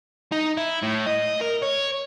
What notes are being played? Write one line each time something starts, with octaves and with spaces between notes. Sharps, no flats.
D#4
E4
A2
D#5
A#4
C#5